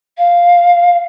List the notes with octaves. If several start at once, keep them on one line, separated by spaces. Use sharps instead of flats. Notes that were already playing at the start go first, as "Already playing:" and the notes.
F5